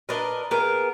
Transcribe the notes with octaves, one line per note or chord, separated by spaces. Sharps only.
D4 A#4 B4 D#5
B3 G#4 A#4